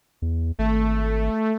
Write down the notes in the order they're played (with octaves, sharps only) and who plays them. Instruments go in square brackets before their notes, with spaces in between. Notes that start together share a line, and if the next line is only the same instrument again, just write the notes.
[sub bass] E2
[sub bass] G#1 [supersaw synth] A3